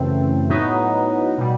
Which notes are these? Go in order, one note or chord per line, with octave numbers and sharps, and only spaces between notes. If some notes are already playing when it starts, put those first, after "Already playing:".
Already playing: F#2 C#3 E3 A3 C4
A2 F#3 B3 D#4
B2 G3